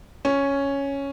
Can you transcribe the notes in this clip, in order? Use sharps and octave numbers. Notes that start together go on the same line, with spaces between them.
C#4